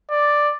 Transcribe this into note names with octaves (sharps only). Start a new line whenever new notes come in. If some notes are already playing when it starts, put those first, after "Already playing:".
D5